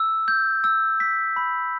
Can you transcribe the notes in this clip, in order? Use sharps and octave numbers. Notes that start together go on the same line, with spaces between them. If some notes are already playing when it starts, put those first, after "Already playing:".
Already playing: E6
G6
E6
B6
B5